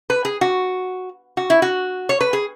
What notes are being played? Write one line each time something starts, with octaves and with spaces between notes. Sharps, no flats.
B4
G#4
F#4
F#4
E4
F#4
C#5
B4
G#4